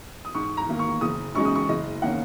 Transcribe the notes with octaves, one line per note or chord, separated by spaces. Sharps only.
D#6
G#2 C#6
A#5
D#3 A#3
C#6
F#1 D#6
F#2 C#3 G#3 D#4 C#6
D#6
C#6
F#1 D#5
D#3 A#3 C#4 F#5